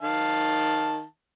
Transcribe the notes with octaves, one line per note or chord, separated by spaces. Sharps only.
D#3 F5 A5